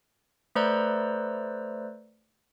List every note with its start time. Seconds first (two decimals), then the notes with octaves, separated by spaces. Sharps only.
0.55 A3 B4 C5 D5 A#5 E6